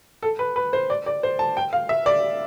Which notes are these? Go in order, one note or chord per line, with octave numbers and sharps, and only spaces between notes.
A4
B4
B4
C5
D5
D5
C5
A5
G5
F5
E5
D5